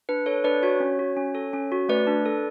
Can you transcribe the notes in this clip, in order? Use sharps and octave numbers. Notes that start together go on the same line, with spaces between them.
D4 B4
A4 C#5
D4 B4 D5
F#4 C#5
C#4
F#4
C#4
A4
C#4
F#4
A3 B4 D5
D4
A4